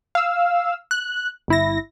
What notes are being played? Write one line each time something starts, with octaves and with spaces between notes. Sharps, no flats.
F5 E6
F#6
G1 E4 A#6